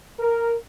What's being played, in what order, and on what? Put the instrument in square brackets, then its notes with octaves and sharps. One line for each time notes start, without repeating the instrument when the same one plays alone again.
[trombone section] A#4